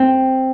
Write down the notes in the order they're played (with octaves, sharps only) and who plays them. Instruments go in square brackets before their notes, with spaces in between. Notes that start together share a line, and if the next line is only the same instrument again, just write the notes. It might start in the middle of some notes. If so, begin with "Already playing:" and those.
Already playing: [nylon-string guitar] C4